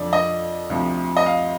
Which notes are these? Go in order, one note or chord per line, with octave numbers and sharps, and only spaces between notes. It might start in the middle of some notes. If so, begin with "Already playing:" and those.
Already playing: F2 D3 F3 D5
D#5
D2 C3 F3
D#5
F5